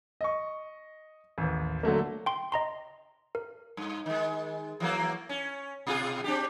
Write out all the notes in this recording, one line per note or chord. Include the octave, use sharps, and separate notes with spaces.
D#5 C#6
A1 D#2
D3 F#3 A3 A#3
G5 C6
D#5 A#5 C6
A#4
G2
D#3 G#3
E3 F#3 A#3
C#4
B2 F4 G#4
C4 D4 G4